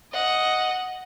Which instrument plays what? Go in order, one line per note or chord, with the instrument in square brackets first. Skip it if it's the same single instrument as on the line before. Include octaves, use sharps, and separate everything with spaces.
[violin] D#5 F#5